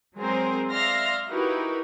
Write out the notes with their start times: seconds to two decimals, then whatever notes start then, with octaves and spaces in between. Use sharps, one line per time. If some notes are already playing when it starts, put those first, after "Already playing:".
0.17 F#3 G#3 C4 G#4 A#4 C5
0.71 D5 E5 F5 C6 F6 A#6
1.29 D#4 E4 F#4 G4 A#4 B4